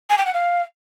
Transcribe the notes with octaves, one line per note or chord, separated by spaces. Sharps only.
G#5
G5
F#5
F5